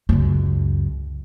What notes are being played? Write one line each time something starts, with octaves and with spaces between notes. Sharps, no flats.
C#2 F#2